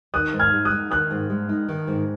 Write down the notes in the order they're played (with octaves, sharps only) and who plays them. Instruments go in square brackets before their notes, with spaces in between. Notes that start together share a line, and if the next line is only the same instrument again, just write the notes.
[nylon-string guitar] D#3 [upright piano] D#6 F#6
[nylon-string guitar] G#2
[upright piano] F6 G#6
[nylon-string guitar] G#3
[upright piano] D#6 F#6
[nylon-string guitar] D#4
[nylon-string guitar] D#3 [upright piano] D#6 F#6
[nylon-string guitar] G#2
G#3
D#4
D#3
G#2